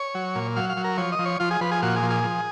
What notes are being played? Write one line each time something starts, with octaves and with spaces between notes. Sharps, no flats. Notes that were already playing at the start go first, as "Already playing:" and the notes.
Already playing: C#5
F#3
A#2
F#3 F5
F5
F#3
A#4
F3 C#5
D#5
F3
C#5
F3 F4
G#4
F3 B4
G#4
A#2 F#4
G#4
F3
G#4
F3